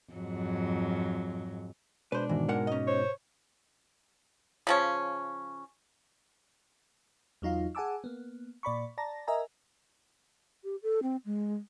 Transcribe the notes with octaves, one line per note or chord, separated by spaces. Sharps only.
F2 G#2 F#3
B2 G#3 D4 B4 C5
G#2 B2 D#3 E3
G#3 A#4 F#5
C#4 D#5
C5 C#5
C#3 F3 C#4
E2 F#3 D#4 F4 F5
G#4 F#5 G#5 A5 D6 E6
A#3 B3
A#2 D5 B5 C#6
D5 A5 A#5 A#6
A#4 D#5 E5 G#5 A#5
G4
A4
C4
G#3